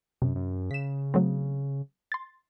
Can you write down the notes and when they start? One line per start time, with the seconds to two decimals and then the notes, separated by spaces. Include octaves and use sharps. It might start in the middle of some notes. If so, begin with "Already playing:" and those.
0.22 F#2 C3
0.35 F#2
0.71 C#3 B6 E7
1.14 F#3 A3 C4
2.12 C6 A6